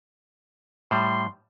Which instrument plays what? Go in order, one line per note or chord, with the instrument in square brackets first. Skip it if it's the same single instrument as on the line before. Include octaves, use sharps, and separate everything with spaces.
[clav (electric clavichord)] A2 G3 [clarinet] C6